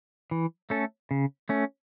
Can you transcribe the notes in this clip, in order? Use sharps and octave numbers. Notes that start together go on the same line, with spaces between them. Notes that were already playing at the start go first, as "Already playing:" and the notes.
E3
A3 C#4 A4
C#3
A3 C#4